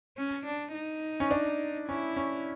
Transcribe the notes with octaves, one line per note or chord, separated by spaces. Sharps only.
C#4
D4
D#4
C#4
D4
C#4 E4
C#4